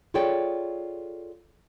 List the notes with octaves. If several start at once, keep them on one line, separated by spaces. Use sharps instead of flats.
F4 G#4 A4 C#5 D5 G5